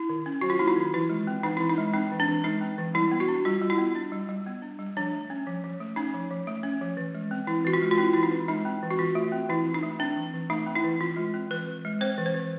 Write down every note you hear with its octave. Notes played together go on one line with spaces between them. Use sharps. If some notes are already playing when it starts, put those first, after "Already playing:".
Already playing: E4
D#3
C#4
F#3 F#4
F4
A#3 E4
D#4
D#3
E3 E4
G#3
C4
E3 D#4
E3 E4
D#4
G#3
C4 D#4
E3
D4
E3
G#3 D#4
C4
E3
G3 E4
B3
F#4
D4
G3 F4
G3
E4
B3
D4
G3
G3
B3
D4
G3
F3 D4
A3
C#4
F3
F3
A3
C#4 D#4
F3
F3
A3
C#4
F3
E3
G#3
C4
E3 E4
E3 F#4
F4
G#3
F4
C4 E4
E3 E4
D#4
E3
G#3 D#4
C4
E3
F#4
E3 F4
A3
C4
E3 E4
E3
D#4
A3
C4 D4
E3
E3
A3 D#4
C4
E4
E3
E3 F4
G#3
C4
E3 B4
E3
G#3
C4 C5
E3
C5
E3